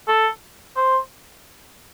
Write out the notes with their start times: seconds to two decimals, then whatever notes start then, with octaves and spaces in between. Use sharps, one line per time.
0.08 A4
0.76 C5